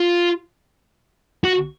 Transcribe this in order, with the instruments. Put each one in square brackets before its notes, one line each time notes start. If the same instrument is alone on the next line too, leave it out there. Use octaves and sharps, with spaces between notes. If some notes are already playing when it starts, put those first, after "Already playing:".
Already playing: [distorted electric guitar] F4
F#4